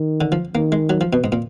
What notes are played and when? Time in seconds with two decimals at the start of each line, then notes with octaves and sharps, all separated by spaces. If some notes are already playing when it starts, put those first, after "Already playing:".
Already playing: D#3
0.21 D3
0.32 F3
0.55 D#3 A#3
0.72 G#3
0.90 F#3
1.01 F3
1.13 B2
1.24 G#2
1.32 A#2